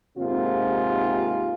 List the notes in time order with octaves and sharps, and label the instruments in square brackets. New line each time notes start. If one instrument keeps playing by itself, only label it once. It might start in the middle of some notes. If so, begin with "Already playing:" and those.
[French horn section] D#2 G#2 C3 C4 F4